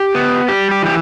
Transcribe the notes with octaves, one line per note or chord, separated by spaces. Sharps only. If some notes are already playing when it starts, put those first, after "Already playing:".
Already playing: G4
B3
G3 G4
G4
E3 G4